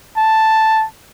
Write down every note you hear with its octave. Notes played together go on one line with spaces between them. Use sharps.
A5